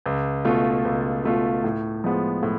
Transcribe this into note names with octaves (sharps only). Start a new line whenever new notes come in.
C#2
B2 A3 F4
C#2
B2 A3 F4
A2
F3 G#3 B3
A2